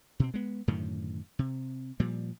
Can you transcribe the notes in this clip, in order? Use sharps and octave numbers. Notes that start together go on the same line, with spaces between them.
B2 C4
G#3 B3
F#2 A2 D3 D#3
C3
A#2 F3 G3